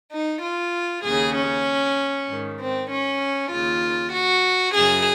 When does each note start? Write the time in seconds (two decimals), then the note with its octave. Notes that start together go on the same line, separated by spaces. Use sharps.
0.11 D#4
0.42 F4
1.04 D#2 C#3 G#4
1.35 C#4
2.28 G#2 D#3
2.59 C4
2.89 C#4
3.51 D#2 C#3 F4
4.12 F#4
4.74 F#2 C#3 G#4